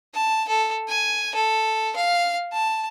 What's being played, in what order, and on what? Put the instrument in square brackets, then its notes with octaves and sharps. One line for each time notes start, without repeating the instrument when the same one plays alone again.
[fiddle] A5
A4
G#5
A4
F5
A5